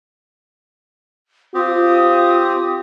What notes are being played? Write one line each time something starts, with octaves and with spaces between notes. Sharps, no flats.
C4 F4 G4 D#6